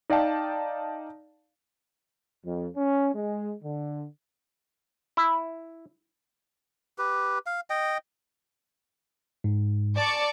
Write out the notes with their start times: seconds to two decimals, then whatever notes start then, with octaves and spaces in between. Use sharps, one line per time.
0.10 D#4 D5 F5 G5 A5
2.45 F2
2.76 C#4
3.15 G#3
3.63 D3
5.17 E4
6.98 G4 B4
7.46 F5
7.70 D#5 G5
9.44 G#2
9.97 D5 A5 C#6